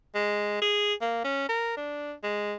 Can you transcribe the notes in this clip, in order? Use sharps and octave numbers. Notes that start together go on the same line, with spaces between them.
G#3
G#4
A#3
C#4
A#4
D4
G#3